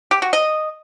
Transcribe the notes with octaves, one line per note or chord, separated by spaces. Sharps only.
G4
F#4
D#5